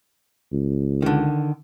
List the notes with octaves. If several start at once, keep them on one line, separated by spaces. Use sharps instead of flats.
C#2
D3 D#3